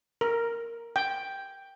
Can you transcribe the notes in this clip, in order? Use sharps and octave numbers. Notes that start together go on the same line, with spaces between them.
A#4
G5